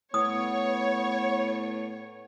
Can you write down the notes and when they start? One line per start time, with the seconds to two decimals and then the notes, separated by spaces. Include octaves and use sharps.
0.14 A2 B3 C#5 D#6